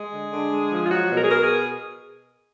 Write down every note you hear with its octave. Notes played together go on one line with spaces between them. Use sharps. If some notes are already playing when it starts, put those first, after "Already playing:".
Already playing: G#3 G#4
D3
D3
G#3
F3
F4
F#3 F#4
B2
A#4
G#4
B2 A#4
G#4